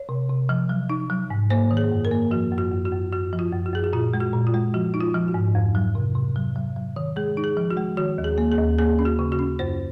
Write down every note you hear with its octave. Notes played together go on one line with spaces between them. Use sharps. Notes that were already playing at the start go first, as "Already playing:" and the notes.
Already playing: C#5
C3
C3
F3
F#3
D#4
F#3
G#2
A#3 C5
D#3
G#4
F#2
A#4
A#3
F3 F#4
F#2
F#4
F#2
F#4
F#2
F#2 F#4
F3
F4
F#2
F#4
F#2 G#4
F#4
A#2 F4
G#3
F#4
A#2
F4
G#3
F3 F#4
D#4
F4
F3
F#4
G#2
F2
F#3
C3
C3
F#3
F#3
F#3
D#3
G#3 G#4
D#4
G#4
F3
F#4
G#3
D#3 F#4
D#2
G#4
A#3
G#4
D#2
A#3 G#4
C#4
F#4
C#3
F#4
C#4
F#2 C5